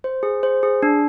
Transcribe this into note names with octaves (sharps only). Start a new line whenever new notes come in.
C5
G#4
C5
G#4
D4